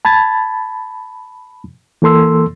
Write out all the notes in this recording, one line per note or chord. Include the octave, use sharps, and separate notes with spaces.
A5 B5 G#6 A6
E3 A#3 A4 C6 E6